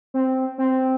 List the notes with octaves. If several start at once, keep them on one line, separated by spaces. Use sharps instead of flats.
C4
C4